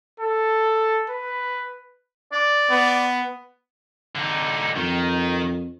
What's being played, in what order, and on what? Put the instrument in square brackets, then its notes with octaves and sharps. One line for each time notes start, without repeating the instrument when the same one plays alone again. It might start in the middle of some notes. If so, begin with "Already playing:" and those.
[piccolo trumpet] A4
B4
[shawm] D5
[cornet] B3
[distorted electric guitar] D3 D#4
[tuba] F2 [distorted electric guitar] D#3